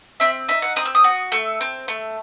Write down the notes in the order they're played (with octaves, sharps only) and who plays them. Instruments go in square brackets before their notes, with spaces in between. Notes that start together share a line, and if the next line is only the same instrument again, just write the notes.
[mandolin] C4 E5
D#4 E5
F#5
C4 D#6
E6
D#6
F#4
A3 E6
C4
A3